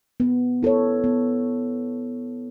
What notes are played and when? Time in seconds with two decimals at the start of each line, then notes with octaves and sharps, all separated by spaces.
0.20 B3
0.63 E4 A4 C#5
1.04 B3